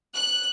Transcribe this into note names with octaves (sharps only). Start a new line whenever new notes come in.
F#6